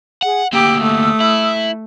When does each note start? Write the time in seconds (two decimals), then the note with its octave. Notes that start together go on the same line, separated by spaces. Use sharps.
0.23 G#4 F#5
0.53 D2 A#3 G4 D#6 E6
0.82 A3
1.20 E4